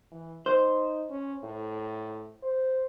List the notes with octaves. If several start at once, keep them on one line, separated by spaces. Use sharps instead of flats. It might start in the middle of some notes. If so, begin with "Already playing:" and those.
E3
D#4 C5
C#4
A2
C5